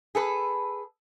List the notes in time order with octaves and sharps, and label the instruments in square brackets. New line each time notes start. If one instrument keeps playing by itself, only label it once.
[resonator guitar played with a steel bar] G#4 A4 B4